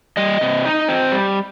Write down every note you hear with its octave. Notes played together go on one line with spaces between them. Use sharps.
G3 D#5
C3
D#4
C4
G3